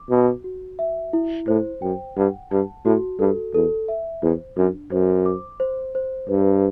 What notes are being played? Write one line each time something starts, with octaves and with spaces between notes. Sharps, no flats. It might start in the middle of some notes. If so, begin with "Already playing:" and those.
Already playing: D6
B2 F#4
F#4
E5
E4
A2 C5
F#2 G5
G2 F#5
G2 A5
A2 F#4
G2 A4
E2 A4
E5
E2 C5
F#2 D4
F#2 C5
D6
C5
C5
G2 B4